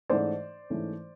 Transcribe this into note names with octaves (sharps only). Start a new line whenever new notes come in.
G#2 E3 A3 C#4 C5 D5
G#2 E3 A3 C#4